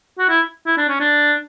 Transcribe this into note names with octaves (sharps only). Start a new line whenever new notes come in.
F#4
E4
E4
D4
C#4
D4